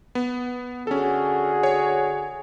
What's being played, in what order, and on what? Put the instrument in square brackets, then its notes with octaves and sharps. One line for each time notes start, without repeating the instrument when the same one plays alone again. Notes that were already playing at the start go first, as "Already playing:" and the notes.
[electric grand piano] B3
[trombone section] D3 F#4 G#4 [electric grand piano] C#4 A4
[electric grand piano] C#5